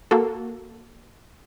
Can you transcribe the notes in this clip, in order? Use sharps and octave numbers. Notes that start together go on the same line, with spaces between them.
A#3 F#4 A4